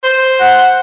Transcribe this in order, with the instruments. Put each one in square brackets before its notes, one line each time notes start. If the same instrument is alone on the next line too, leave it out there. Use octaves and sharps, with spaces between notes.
[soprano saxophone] C5
[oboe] F#5